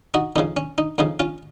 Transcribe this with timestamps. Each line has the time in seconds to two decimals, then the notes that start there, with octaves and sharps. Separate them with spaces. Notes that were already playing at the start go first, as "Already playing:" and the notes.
0.14 D#4 F#4
0.36 F2 C#3 F3 D#4
0.57 C#4
0.78 D#4
0.98 F2 C#3 F3 D#4
1.20 C#4 F4